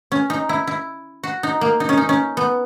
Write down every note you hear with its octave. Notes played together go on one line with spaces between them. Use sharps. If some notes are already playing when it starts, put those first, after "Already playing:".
C#4
D#4
E4
E4
F#4
D#4
A#3
D#4
C#4
D#4
C#4
B3